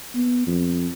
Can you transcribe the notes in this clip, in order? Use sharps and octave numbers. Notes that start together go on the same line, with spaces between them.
B3
F2